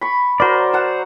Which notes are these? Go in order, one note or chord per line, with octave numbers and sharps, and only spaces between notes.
B5 C#6
F#3 A#4 C5 D5
F#5 A5 A#5